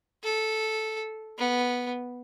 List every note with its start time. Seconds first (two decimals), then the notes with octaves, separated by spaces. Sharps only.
0.24 A4
1.38 B3